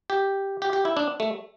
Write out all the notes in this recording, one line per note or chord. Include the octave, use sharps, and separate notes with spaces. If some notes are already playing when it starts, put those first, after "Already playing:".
G4
G4
G4
E4
D4
A3